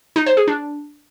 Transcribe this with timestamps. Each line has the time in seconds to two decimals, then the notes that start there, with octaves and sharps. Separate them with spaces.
0.16 D#4
0.26 C5
0.37 G#4
0.48 D4